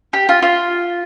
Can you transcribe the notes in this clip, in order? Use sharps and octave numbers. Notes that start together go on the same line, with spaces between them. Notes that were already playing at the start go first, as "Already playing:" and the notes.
G4
F4
F4